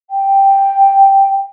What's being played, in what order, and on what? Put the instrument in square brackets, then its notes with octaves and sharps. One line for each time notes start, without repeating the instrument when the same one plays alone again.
[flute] G5